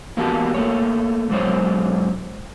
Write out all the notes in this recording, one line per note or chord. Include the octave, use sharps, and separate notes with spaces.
E2 A#3 B3 F#4 G4 A5
A3 A#3 C#5
G#2 B2 F#3 C#4 C5 C#5